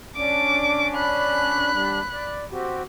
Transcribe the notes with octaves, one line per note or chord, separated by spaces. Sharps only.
C#4 D4 D6
B5 F#6
G3 D4
D5
C4 F#4 G4